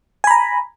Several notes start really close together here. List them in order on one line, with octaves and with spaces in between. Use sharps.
G#5 B5 A#5